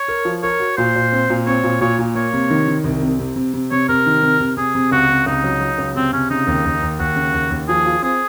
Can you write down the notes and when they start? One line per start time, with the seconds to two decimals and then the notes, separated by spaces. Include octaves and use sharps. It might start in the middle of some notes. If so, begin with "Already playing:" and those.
Already playing: C#5
0.08 A#4
0.25 F3
0.43 A#4 C#5
0.60 F#4
0.77 A#2 C5
0.95 A#2
1.12 C4
1.30 A#2
1.46 C4 C#5
1.63 A#2
1.81 A#2 C#5
1.99 A#2
2.15 A#3 C#5
2.33 C3
2.50 D#3
2.68 D#3
2.84 C2
3.02 C3
3.19 C3
3.36 C3
3.54 C3
3.71 C3 C#5
3.88 C3 A#4
4.06 D#3
4.23 C3
4.40 C3
4.57 C3 G#4
4.75 C3
4.91 C#2 F#4
5.09 C3
5.26 C#2 D#4
5.44 F#3
5.61 F#3
5.78 C#2
5.95 C3 C4
6.13 C3 C#4
6.30 C#3 D#4
6.47 D#2
6.65 D#2
6.82 D#2
7.00 D#2 F#4
7.16 C#3
7.33 D#2
7.51 D#2
7.68 F3 G#4
7.86 F4
8.02 C4 G#4